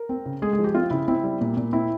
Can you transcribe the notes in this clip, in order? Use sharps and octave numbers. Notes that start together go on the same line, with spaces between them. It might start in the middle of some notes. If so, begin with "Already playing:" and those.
Already playing: A#4
C4
C#3
G#3 G#4
G#4
F3
G4
C4 F4
C#3 E4
C4 E4
G3
A#2
A#2
C4 E4